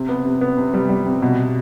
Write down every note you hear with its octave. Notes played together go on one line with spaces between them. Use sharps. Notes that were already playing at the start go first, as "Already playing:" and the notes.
Already playing: C3
B3
C3
B3
C3
G3
G3
C3
B2